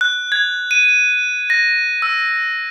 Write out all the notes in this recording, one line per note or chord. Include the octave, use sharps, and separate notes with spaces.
F#6
G#6
D#7
A#6
E6